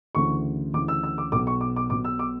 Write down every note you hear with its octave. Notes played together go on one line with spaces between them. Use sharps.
D2 C#3 E3 C#6
D2 C#3 E3 D6
E6
E6
D6
B1 B2 D6
C#6
D6
D6
B1 B2 D6
E6
D6